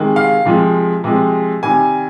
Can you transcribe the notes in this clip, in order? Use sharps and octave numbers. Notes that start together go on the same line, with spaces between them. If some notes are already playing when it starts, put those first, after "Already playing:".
Already playing: C3 D#3 G#3
F5
C3 F3 G#3
C3 F3 G#3
C3 D#3 G3 G#5